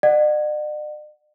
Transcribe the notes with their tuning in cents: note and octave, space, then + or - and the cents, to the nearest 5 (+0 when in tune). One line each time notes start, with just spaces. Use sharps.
D5 +45 F#5 +0